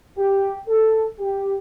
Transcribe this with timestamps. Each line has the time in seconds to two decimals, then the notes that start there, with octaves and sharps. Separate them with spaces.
0.18 G4
0.68 A4
1.19 G4